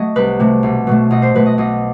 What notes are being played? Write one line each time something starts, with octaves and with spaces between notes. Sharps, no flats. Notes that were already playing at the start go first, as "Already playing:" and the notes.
Already playing: F#3 A3 D#5
C2 B4
C3 F#3 A3
B1
B2 F#3 A3
B1 D#5
C5
B2 F#3 A3 B4
D#5
B1 D#5